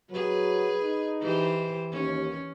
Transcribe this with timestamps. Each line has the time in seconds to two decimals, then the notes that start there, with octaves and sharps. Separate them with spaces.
0.10 F#3 G#4 B4
0.82 D#4
1.20 E3 G4 C5
1.91 D#2 C#4